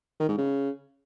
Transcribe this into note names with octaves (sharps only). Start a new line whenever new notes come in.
D#3
G#2
C#3